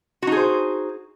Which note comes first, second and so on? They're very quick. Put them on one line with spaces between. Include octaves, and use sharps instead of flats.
F#4 D#4 G#4 C5